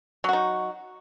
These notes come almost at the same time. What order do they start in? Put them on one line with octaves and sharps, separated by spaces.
F#3 F#4 D#4